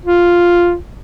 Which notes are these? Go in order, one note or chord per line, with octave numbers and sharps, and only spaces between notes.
F4